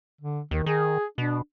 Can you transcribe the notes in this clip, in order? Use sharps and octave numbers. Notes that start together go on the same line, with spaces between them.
D3
D#2 D#3
D#3 G#4
B2 D4